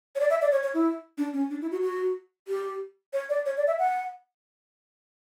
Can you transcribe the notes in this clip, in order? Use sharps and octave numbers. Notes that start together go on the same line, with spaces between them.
C#5
D5
E5
D5
C#5
C#5
E4
D4
C#4
D4
E4
F#4
F#4
G4
C#5
D5
C#5
D5
E5
F#5